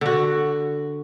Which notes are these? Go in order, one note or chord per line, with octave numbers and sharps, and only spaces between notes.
D3 F#4